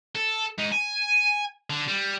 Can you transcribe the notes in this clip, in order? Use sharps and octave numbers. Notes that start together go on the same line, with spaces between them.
A4
G#2 D#4
G#5
D3
G3